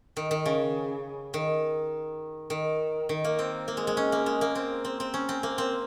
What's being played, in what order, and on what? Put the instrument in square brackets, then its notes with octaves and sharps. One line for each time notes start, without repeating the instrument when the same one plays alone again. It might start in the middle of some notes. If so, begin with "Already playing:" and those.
[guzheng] D#3
D#3
C#3
D#3
D#3
D#3
A#3
C4
A#3
G#3
G#3
C#4
A#3
G#3
A#3
C4
C4
C4
C#4
C4
A#3
C4